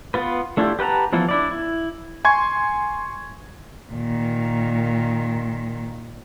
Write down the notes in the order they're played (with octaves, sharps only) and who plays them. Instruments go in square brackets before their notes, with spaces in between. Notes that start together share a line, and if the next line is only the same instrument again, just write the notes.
[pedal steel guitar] B3 F4 B4
A3 D4 E4 F4 G4
G4 B4 F#5 A5 A#5
E3 F3 B3 E4 F4
D4 E4 D5
E4
[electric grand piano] G#5 C6 C#6 G#6
[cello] A#2 D#3